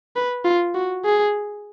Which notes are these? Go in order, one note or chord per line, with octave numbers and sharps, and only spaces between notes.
B4
F4
F#4
G#4